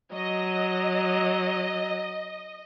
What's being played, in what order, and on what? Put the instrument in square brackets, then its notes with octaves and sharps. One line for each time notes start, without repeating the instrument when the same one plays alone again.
[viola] F#3 [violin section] D#5